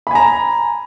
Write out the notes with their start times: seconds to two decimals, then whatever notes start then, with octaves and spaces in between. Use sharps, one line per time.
0.07 B5
0.11 G#5
0.15 A#5